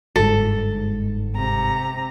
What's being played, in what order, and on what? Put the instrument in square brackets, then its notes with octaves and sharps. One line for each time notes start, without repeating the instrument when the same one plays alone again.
[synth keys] G1 G#2 [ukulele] A4
[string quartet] C3 A#5